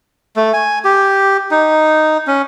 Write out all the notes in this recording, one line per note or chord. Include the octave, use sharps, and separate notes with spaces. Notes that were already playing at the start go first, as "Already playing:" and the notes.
A3
G#5
G4
D#4
C#4